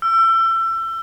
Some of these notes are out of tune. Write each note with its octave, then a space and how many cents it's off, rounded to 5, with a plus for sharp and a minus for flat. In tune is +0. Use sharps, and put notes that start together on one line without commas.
E6 +30